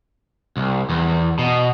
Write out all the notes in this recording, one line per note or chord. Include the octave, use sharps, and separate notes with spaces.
C2
E2
B2